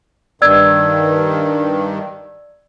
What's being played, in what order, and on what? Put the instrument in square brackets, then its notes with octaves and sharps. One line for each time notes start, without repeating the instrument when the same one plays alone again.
[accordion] G2 D#3 [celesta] D5 E6 G#6